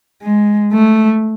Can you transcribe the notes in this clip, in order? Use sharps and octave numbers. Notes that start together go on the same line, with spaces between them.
G#3
A3